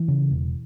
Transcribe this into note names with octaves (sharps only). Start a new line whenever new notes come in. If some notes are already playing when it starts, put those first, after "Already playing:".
Already playing: E3
C#3
E1